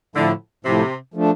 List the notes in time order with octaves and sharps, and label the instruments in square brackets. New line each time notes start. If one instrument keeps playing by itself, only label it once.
[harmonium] A2 F3 A3 E4 [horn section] D3
[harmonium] A2 F3 A3 E4 [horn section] C3
[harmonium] F3 A3 D4